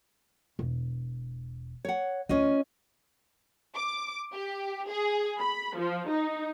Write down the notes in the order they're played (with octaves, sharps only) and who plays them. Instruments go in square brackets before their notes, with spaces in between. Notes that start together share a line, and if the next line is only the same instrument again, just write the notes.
[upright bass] E1
[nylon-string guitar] C#5 F#5
[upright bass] D2 [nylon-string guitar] C#4 F4 D#5
[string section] D6
G4
G#4
B5
F3
D#4